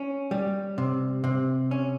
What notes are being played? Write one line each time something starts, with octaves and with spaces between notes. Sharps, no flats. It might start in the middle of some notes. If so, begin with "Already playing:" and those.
Already playing: C#4
G3
C3
C3
C#4